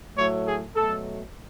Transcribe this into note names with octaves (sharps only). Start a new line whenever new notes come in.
A2 F#3 A3 C#5
G#4
B2 F#3 A3 A4